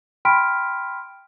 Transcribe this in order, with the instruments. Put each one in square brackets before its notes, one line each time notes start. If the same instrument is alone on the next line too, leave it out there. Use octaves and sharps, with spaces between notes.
[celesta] G5 B5 C6 F6 B6 D7